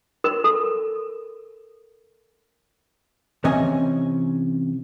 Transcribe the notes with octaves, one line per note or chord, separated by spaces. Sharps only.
A#4
A4
C3 E3 C4 C#4 D#5 G#5